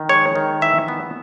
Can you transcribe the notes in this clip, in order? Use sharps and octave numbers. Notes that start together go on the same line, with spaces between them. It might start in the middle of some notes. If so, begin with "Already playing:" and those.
Already playing: D#3
G#3 C#5
D#3
E3 E5
B3